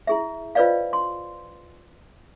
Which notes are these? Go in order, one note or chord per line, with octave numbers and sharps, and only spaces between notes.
E4 G#4 E5
F4 B4 C5 D5 D#5 F5
C6